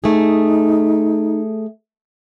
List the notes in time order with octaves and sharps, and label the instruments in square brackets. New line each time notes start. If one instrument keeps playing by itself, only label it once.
[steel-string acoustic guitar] A3 G#4 [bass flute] D#4